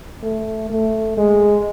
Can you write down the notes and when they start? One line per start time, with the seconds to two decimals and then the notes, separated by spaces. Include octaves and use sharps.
0.23 A3
0.70 A3
1.17 G#3